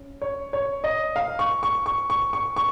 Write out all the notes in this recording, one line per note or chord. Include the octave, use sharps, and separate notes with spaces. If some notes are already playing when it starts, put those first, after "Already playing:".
Already playing: C#4
C#5
C#5
D#5
F5
C#6
C#6
C#6
C#6
C#6
C#6